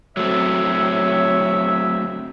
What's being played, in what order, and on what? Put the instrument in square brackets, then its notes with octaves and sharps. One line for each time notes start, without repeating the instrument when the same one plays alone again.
[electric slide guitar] F#3 A3 C4 [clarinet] C#5 [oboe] E5